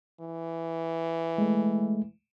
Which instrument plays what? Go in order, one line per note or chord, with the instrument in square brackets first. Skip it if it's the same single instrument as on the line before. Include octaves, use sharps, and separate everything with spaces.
[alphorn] E3
[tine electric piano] G#3 A3